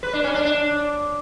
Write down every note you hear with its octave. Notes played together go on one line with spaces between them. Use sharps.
B4
D4
C#4
D4
D4